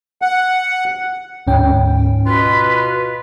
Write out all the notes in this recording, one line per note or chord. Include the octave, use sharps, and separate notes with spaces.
F#5
D2 G#2 C#4 G5
B2 F4 B4